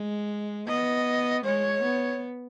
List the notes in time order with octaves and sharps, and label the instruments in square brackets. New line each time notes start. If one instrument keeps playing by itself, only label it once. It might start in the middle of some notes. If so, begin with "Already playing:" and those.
Already playing: [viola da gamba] G#3
[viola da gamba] B3 [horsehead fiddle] D#5
[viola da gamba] G#3 [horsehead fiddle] C#5
[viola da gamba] B3